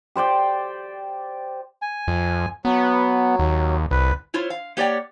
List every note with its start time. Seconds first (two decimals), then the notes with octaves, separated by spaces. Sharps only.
0.16 G4 C5 D5 G5
1.82 G#5
2.08 F2
2.65 F#3 B3
3.39 D#2
3.91 C2 B4
4.34 E4 F4 C5 C#5
4.50 F5
4.77 A#3 G4 C#5 D5 F#5 G5